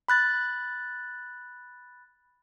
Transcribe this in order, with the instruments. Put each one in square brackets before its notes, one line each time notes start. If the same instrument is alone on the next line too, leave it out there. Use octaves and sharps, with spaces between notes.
[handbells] B5 F#6 A6